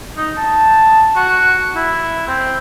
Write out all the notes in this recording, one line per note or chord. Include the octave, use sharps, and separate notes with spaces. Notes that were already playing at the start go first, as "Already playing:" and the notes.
D#4
A5
F#4
E4
C4